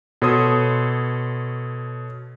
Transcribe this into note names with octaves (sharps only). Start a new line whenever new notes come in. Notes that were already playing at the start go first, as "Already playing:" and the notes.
B2 A4 C#5 C6 D#6